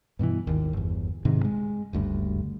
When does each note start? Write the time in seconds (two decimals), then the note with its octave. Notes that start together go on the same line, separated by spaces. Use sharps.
0.19 G2 B2 D3 E3
0.47 G#1 D#2
0.73 G1 E2
1.25 G#2 C3 D#3
1.45 G#3
1.93 F#1 D2 G2